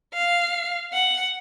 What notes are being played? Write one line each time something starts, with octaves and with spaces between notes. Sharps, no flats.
F5
F#5